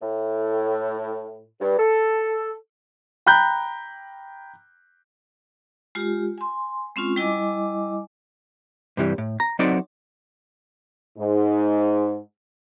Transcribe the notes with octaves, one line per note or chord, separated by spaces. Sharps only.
A2
G2
A4
G5 A#5 B5 F#6 G6
G#3 F4 G4
G#5 C6
G#3 C4 C#4 F4
G3 E4 D#5 G#5 D6
G2 C3 E3 G3
A2
A#5
F#3 C4 D#4 F#4 A4 D5
G#2